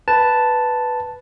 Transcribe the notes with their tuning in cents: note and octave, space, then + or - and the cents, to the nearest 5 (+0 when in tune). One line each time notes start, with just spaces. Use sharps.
B4 +0 A5 +0